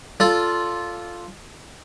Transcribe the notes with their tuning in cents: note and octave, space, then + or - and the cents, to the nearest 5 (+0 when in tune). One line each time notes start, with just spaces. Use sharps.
F4 +0 A4 +0 D5 -20